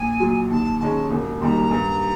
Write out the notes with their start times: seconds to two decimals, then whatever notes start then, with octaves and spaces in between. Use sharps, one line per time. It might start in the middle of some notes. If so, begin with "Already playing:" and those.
Already playing: A#1 G#5
0.20 A#2 F#3
0.50 D#2 A5
0.80 D#3 G#3 C#4 A5
1.10 E1
1.41 D#2 D#3 G3 A#5 C6
1.71 G2